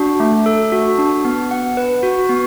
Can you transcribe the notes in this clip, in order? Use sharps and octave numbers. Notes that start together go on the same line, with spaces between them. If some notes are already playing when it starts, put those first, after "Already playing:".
Already playing: D4 F#4
A3
A4
F#4
D4
B3
F#5
B4
F#4
B3